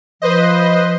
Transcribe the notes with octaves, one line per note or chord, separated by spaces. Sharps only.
F3 B4 C5 D#5